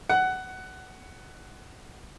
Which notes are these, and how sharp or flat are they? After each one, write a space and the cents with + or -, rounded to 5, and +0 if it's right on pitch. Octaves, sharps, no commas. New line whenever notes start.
F#5 +15